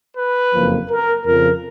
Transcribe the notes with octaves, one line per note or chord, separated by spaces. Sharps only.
B4
F#1 F2 F3 A#3
A#4
F2 C#3 F3 A#4